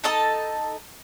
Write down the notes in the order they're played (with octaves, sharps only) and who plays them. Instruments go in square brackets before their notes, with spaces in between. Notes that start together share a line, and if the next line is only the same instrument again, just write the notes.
[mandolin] D#4 A4 D#5 A5